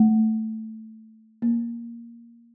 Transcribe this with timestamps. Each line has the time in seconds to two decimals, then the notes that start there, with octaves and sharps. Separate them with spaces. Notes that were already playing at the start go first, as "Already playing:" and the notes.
Already playing: A3
1.42 A#3